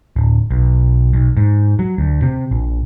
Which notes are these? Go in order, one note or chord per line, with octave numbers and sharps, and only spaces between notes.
D1
B1
B1
G#2
F#3
D2
C3
A#1